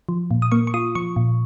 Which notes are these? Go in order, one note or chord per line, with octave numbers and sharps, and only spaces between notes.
F3
A#2
D#6
A#3 C#6
C#6
F4 D#6
F3 C#6
A#2